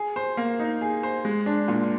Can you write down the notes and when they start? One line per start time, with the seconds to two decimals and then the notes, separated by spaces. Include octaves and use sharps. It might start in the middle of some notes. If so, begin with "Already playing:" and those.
Already playing: G#4
0.16 C5
0.37 A#3
0.60 D#4
0.81 G#4
1.03 C5
1.25 G#3
1.46 D4
1.68 A#2